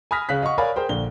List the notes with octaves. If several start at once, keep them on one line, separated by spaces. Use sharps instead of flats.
G#5 B5 D#6 F6 A#6 B6
C#3 F5 F#6 B6
D#5 F5 F#5 C#6
A#4 C#5 D5 F5 G#5 B5
G#4 A#4 C5 G5
A#1 D3 G7